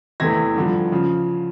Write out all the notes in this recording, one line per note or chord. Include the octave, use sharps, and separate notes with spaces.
E2 C3 E3 A3 G#6 A#6
G2 D3 F3
C#3 F3